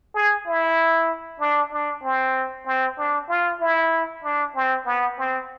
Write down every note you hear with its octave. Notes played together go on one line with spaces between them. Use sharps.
G#4
E4
D4
D4
C4
C4
D4
F4
E4
D4
C4
B3
C4